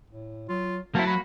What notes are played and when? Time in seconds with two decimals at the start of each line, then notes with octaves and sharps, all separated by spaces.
0.10 A2
0.49 F#3 F4
0.95 F#3 A3 A#3 C4 E4 A5
1.07 A#3 F#4 B5